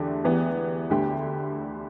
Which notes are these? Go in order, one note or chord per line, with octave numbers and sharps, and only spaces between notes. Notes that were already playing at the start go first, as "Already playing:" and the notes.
Already playing: E2 D3 A3 D4 G4
E2 E3 B3 G4
D2 D3 A3 G4